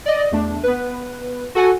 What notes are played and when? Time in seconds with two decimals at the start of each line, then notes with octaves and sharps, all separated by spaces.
0.06 D5 D#5
0.31 E2 A3 D4
0.63 B3 B4
1.55 F#4 A4 F#5 G#5